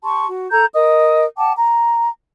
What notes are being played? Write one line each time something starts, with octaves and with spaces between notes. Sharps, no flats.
G4 A5 C6 C#6
F#4
A4 A#5 G6
A#4 D#5 D#6
F#5 G5 A5 D6
A#5